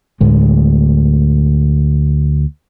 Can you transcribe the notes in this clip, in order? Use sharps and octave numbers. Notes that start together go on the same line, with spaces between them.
D2 A2 G#3